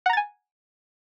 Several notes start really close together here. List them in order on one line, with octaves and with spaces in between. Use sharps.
F#5 A#5 A6 G#5